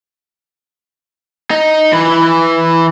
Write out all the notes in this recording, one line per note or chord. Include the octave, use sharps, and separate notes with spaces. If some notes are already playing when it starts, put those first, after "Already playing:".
D#4
E3 B4